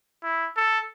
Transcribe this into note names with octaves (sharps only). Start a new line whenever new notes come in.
E4
A4